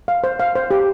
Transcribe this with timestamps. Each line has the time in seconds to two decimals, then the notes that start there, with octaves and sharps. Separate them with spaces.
0.08 F5
0.24 C5
0.40 F5
0.55 C5
0.71 G4